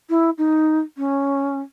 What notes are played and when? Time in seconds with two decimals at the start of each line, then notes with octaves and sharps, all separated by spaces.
0.09 E4
0.38 D#4
0.97 C#4